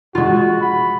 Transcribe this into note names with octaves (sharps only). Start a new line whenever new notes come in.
G#3 F4 F#4
B5